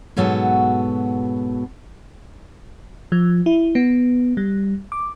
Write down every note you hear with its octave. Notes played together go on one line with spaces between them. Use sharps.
G#2 B2 F#3 B3 F#4 A4
F3
E4
B3
G3
D6